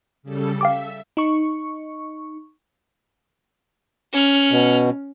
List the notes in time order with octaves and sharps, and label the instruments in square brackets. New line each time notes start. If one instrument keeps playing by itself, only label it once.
[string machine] C#3 G3 A4
[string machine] E5 [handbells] F5 G5 D6
[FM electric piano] D#4 C#6
[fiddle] C#4 F6
[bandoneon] B2